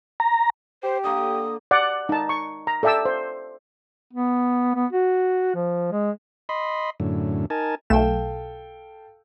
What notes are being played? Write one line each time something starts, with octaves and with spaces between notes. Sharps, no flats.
A#5
G4 C5
D3 A#3 D#6
D5 F#5
D#4 A5
C#6
A#5
A4 D5 E5 G5 A5 E6
C5
B3
B3
F#4
F3
G#3
D#5 B5 C6
F#2 A2 D3
D#4 A#4 G#5 A5
B1 A3 A4 F5 G5 E7